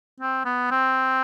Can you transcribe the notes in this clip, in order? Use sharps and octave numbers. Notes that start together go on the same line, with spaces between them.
C4
B3
C4